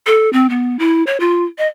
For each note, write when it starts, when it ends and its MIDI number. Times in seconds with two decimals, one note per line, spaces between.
0.06 0.31 69
0.33 0.49 60
0.50 0.79 59
0.79 1.03 64
1.07 1.17 73
1.20 1.44 65
1.58 1.67 75